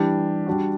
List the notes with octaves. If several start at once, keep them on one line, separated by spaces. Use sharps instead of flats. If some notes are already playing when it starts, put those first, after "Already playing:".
Already playing: E3 G3 D4 G4
G3 D4 F#4